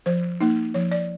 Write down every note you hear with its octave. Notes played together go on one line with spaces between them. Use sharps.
F3 C5
A#3 D#4
F3 C#5
D5